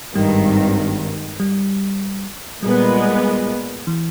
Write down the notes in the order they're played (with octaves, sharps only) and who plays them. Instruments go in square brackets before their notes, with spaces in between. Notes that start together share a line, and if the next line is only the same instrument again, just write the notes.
[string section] G#1 G2 D#3 [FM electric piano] G3
[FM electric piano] G3
[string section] A#2 G#3 B3 [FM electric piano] G3
[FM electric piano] E3